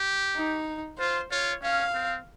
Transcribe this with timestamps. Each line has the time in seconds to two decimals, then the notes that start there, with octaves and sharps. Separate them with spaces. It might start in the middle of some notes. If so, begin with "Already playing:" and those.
Already playing: G4
0.35 D#4
0.98 F4 C5
1.31 F4 C#5
1.62 C#4 F5
1.94 C4